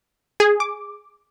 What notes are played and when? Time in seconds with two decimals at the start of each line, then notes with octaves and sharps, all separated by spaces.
0.40 G#4
0.60 D6